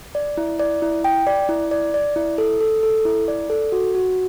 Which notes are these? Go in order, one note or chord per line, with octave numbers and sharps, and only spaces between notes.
D5
E4
D5
E4
G5
D5
E4
D5
D5
E4
A4
A4
A4
E4
D5
A4
F#4
F#4